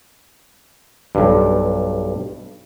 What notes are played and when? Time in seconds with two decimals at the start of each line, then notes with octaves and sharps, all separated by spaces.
1.15 B1 G2